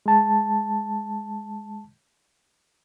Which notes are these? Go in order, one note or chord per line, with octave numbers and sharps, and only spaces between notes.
G#3 A5